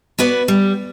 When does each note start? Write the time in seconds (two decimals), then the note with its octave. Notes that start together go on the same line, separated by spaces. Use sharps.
0.19 B3 F#4 B4 D5
0.48 G3